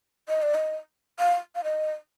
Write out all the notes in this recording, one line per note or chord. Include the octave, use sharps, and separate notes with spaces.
D#5
D5
D#5
F5
F5
D#5